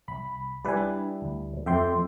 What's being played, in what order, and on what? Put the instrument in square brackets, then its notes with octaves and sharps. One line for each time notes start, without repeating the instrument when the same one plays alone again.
[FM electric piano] C2 B5
[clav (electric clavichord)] G3 E4 B4 [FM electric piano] D5 G#5
[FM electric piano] D4
D2
[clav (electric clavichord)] F2 [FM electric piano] E5 G5 C6